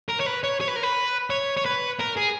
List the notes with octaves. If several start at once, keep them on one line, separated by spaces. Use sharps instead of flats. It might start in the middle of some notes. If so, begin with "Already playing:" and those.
A#4
C#5
B4
C#5
C#5
B4
A#4
B4
C#5
C#5
B4
A#4
G#4